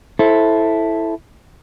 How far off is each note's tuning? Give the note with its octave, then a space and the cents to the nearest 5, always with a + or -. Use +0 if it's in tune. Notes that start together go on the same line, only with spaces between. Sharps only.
E4 +0 A4 -5 C5 +20